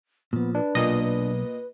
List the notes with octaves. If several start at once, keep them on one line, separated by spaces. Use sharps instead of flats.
A#2 F3 B3
D4 B4
B1 A#2 D#5
B4